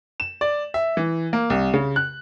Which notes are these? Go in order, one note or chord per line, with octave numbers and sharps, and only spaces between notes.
E7
D5
E5
E3
A#3
C2
C#3
F#6